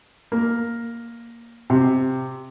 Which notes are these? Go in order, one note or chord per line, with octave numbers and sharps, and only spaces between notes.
A#3
C3